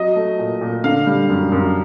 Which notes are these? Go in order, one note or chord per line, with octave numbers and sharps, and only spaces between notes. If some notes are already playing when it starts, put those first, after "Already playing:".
Already playing: F#3 D#5
A3
A#2
A#2
D3 F5
G3
F#2
F#2